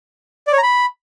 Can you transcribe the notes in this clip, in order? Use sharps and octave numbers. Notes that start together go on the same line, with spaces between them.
D5
C#5
A#5
B5